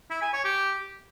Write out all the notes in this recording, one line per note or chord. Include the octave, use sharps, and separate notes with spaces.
E4
G#5
C#5
G4